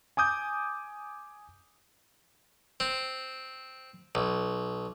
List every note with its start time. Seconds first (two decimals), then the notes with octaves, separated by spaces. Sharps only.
0.17 G#5 D6 D#6 G6
2.80 C4
4.15 B1